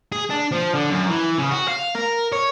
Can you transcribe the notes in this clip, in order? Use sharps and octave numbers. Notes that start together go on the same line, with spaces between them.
G#4
D4
F3
D3
F#2
E3
C#3
F#4
F5
A#4
C#5